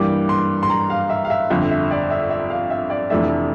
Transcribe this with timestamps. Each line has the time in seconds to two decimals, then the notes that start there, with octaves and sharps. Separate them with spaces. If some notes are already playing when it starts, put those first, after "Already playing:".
Already playing: G2 E3 G3 A#3 D6
0.29 C6
0.63 C6
0.70 A#5
0.90 F5
1.10 E5
1.25 F5
1.30 E5
1.50 G1 F2 D3 E5
1.71 E5
1.91 D5
2.10 E5
2.30 E5
2.50 F5
2.70 E5
2.90 D5
3.10 F1 F2 E3 A3 D4 E5